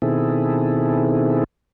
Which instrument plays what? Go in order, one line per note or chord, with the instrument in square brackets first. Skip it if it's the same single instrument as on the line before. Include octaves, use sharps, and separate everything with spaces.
[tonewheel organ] B2 D#3 C4 E4 G#4 A4